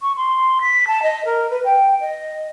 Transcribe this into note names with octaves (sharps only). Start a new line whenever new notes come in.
C#6
C6
B6
A5
D#5
A#4
B4
G5
D#5